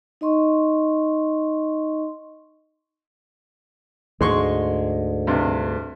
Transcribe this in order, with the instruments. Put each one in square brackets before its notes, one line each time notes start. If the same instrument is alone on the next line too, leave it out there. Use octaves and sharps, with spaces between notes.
[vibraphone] D#4 D#5 C6 C#6
[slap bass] D2 G#2 [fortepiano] G#3 C6 C#6
[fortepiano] G2 C3